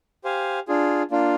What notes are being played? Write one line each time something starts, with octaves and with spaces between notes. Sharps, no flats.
G4 C5 F5 G#5
D4 F4 G#4
A#3 D4 F4